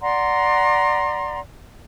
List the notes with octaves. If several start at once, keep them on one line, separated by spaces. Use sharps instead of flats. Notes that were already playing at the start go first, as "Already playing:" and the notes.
D5 F#5 A#5 C6